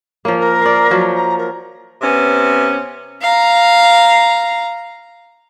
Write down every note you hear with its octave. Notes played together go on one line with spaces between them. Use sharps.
F3 A#3 C#5
A#4
D5 F5
F3 F#3
A#5
A#4
C3 B3 C#4
F5 A#5